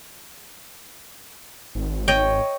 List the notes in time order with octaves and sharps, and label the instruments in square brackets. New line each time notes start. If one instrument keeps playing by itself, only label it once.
[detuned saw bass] G#1
[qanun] C#5 D#5 G5